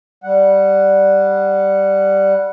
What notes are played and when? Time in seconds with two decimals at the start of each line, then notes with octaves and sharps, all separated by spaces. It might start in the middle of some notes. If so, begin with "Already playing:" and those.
0.24 G3 F#5